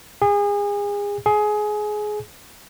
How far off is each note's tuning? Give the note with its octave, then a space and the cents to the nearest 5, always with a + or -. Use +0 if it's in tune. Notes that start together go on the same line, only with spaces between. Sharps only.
G#4 -30
G#4 +20